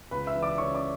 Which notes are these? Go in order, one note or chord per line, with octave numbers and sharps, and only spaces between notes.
C#2 B4 B5
E5 E6
E3
D5 D6
C#3 C#5 C#6
D5 D6